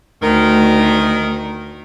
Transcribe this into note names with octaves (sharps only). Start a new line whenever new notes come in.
D2 D#3 A#4